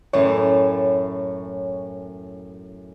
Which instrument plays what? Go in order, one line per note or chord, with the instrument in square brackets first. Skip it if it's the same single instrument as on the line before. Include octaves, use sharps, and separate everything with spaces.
[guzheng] F#2 A2 E3 [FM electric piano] C#5